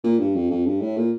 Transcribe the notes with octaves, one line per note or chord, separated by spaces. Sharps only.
A#2
G2
F2
F2
G2
A2
A#2